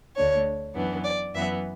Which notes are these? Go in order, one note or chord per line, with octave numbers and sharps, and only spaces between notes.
D2 D3 A3 D4 C#5
F#2 E3 B3 D4
D5
F#2 E3 B3 E5